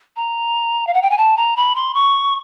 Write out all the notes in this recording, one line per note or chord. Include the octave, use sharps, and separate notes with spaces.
A#5
F5
F#5
G5
G#5
A5
A#5
B5
C6
C#6